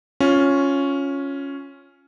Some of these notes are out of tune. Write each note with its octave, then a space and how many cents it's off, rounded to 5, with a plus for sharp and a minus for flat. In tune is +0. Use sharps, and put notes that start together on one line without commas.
C#4 +0 F4 +10